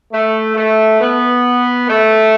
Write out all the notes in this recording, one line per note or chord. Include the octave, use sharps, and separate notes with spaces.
A3
A3
B3
A3